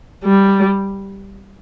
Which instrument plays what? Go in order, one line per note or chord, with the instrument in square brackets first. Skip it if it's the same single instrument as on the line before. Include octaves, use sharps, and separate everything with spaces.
[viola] G3